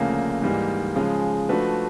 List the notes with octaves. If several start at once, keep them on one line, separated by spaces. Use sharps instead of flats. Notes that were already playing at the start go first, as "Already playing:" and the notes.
Already playing: D2 C#3 F3 A#3
G#2 E3 G3 A#3 D#4
C#3 F3 G#3
F3 A3 D4 F#4 B4